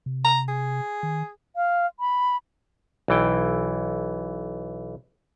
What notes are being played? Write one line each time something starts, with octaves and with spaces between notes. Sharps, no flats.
C3
A#5
G#4
D#3
F5
B5
B1 E3 G5